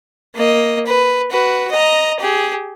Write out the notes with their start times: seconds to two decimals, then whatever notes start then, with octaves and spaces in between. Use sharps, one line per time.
0.36 A#3 D#5
0.86 B4
1.31 F#4 B4
1.71 D#5 A#5
2.20 G4 G#4